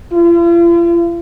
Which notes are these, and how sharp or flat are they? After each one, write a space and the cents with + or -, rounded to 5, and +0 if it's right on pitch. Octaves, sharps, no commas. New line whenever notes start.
F4 -45